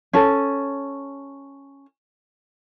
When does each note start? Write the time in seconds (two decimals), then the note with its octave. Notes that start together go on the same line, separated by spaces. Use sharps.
0.13 C#4 A4